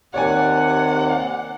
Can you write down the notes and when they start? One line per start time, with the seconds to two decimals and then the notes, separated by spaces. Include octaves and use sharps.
0.14 D#2 C3 C#5 D5 F#5 G#5